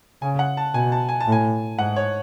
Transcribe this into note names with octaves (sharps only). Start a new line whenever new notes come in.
C#3 G#5
F#5
A5
B2 G#5
A5
G#5
A5
A2
G#5
G#2 F#5
C#5